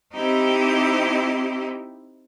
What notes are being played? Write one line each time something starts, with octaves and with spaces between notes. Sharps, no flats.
C4 D#4 E4 G4